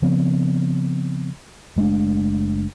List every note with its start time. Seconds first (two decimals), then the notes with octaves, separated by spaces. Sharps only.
0.02 C#3 F3 B3 C4
1.76 F#1 G#3 A3 D4